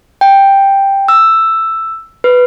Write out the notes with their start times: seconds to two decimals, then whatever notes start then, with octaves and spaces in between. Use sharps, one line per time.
0.21 G5
1.08 E6
2.24 B4